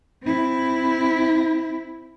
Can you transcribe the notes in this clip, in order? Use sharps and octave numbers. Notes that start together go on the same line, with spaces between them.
C4 E4